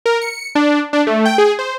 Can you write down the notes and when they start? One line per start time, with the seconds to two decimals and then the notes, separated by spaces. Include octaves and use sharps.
0.06 A#4
0.21 C#7
0.55 D4
0.93 D4
1.07 A3
1.25 G5
1.38 G#4
1.59 C5